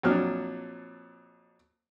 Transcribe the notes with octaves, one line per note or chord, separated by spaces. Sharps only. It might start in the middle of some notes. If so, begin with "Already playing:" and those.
F2 A#2 F#3 D4 F6